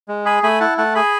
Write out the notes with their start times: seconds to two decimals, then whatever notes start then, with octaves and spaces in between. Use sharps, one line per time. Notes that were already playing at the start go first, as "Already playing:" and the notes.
0.08 G#3
0.25 G#4 G#5 B5
0.43 A3 G#5 B5
0.60 E4 F#5 A5
0.78 A3 F#5 A5
0.95 G#4 G#5 B5